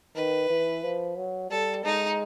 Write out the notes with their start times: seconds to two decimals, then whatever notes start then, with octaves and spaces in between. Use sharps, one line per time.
0.16 D#3 B4
0.50 E3
0.83 F3
1.16 F#3
1.50 G3 A4
1.84 G#3 D#4